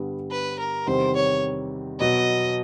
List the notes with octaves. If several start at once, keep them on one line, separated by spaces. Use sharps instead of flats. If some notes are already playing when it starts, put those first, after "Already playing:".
Already playing: G2 D3 G3 B3
B4
A#4
E2 C3 D#3 G3 C4 C5
C#5
B2 F#3 B3 D#5